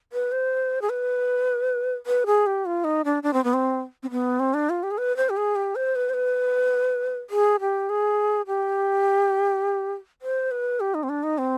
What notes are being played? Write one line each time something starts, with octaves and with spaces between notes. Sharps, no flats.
B4
C5
G#4
B4
B4
G#4
G4
F4
D#4
D4
D4
C4
B3
C4
C4
B3
C4
D4
F4
G4
G#4
B4
C5
G4
G#4
G4
C5
B4
C5
B4
G#4
G4
G#4
G4
C5
B4
G4
D#4
C4
D4
D#4
C4